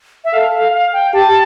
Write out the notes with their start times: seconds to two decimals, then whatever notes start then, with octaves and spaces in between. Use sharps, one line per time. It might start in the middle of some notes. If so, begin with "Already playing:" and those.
0.25 E5
0.33 A4 F5
0.54 F5
0.73 F5
0.93 G5
1.14 G4 A5